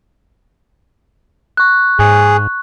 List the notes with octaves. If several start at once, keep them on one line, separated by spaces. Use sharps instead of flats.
C#6 F#6
G#2 G#4